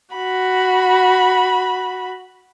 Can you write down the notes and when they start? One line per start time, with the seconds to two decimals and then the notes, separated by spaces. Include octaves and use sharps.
0.16 F#4 B5